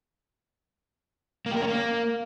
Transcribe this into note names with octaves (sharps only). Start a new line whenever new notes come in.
A#3
G4
A#4
C#4
A#3